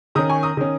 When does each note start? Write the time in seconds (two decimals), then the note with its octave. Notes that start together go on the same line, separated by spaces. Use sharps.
0.15 D#3 C#4 A#5 D#6
0.29 G#5 C#6
0.43 A#5 D#6
0.57 D#3 C#4